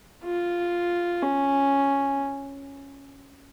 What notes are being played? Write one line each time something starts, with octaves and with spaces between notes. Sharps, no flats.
F4
C#4